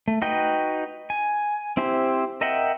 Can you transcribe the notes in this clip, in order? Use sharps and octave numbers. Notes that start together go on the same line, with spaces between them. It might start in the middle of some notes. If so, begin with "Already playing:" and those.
A3
D#4 F#4 B4 D#5 G5
G#5
C4 E4 G4 C5
A#4 D#5 E5 F#5 G5